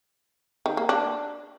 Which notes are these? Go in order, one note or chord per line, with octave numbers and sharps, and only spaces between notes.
D#3
A#3
D4